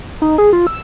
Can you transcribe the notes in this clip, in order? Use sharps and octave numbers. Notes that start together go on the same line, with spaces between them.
D#4
G#4
F4
E6